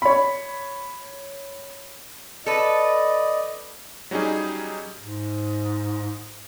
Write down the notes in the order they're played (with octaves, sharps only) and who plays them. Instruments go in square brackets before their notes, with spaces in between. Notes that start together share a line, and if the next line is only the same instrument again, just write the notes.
[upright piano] C#5 B5
[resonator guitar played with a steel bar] A4 B4 [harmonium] D5 D#5
[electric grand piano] F#3 G3 C#4 D#4 G#4
[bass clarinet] G#2